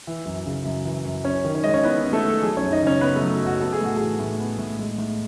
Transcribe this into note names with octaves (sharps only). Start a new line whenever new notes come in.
E3
F#2
C#3
F#2
E3
F#2
C#4 C#5
D#3
C#5
G#3 D#5
C#4 C#5
B3 E4 B4
C#4
A3 A4
D#3
F#3 G#4
C#4 C#5
F#2
D#4 D#5
C#3 C#4 C#5
F#2 B3 B4
A3 A4
F#3
F#2
F#4
B3 A4
G#4
A2 F#4
E3 G#4
A2
B3
A2
G#3
A2